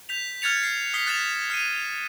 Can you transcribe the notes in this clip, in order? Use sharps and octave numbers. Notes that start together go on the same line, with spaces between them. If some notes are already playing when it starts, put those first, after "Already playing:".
G6 B6 F7
F6 F#6 G#6 A6 C#7 F7
C7
D#6 B6 C7 G7
D#6 F#6 A6 B6 E7 F7
F6 C7 D#7